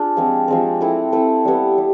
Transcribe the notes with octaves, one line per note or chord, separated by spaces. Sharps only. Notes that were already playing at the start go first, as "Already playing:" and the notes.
Already playing: D4 F4 G#4
F3 G#3 C4
F3 G#3 C4
A3 C4 E4
A3 C4 E4
G3 B3 E4
G3